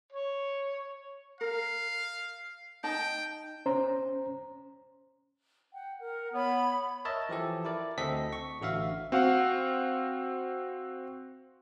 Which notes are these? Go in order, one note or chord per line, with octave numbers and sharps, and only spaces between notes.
C#5
A#4 F5
D#4 G5 A5
C#4 C5 A#5
F#5 G5
A#4 F#5
B3 C#5 B5
A#4 C#5 D#5 E5 A5
E3 F3 G4 A4
E4 A#4 D5
D2 C4 A4 D#5 B6
C#6
A1 D3 F#4 E5 F5
C4 F#4 F5 F#5